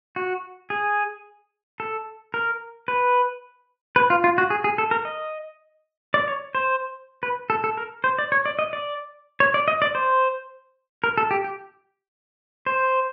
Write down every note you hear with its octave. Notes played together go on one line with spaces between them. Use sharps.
F#4
G#4
A4
A#4
B4
B4
F4
F4
F#4
G#4
G#4
A4
A#4
D#5
D5
C#5
C5
B4
A4
A4
A#4
C5
D5
C#5
D5
D#5
D5
C#5
D5
D#5
D5
C5
A#4
A4
G4
G4
C5